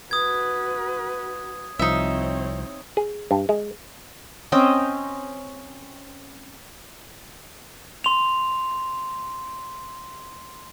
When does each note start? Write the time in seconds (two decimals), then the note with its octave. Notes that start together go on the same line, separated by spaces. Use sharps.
0.11 F#4 B4 D#6 G#6
1.79 C2 F3 C4 D#4 C#5 E5
2.97 G#4
3.31 G2
3.49 G#3
4.52 C4 C#4 D#5 G5
8.04 C6 F7